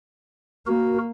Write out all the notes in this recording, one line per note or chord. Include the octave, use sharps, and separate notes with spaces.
A#3 F#4 A#4